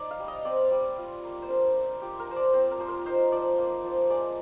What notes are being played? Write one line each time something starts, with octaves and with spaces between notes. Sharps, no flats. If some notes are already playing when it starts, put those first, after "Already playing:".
Already playing: D#4 D5
F5
G3
D#5
C4 D5
G3
F4
A#3
C5
D4 A#4
A#3
F4 G4
A#4
F3 C5
D5
C4 C5
A#4
F3 C5
A#4
D#4 C5
F3 D5
A#3
F3
G#3 D5